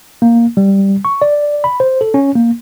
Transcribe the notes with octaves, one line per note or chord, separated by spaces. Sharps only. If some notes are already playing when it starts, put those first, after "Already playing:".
A#3
G3
C#6
D5
B5
C5
A4
C#4
A#3